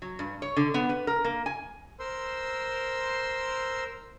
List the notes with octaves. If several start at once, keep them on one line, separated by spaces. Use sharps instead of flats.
F#3
G2
C#5
D3
B3
B4
A#4
A#3
G#5
A#4 C5 C6 E6